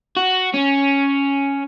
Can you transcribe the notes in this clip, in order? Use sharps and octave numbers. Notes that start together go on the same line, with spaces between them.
F#4
C#4